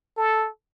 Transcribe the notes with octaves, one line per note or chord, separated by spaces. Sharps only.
A4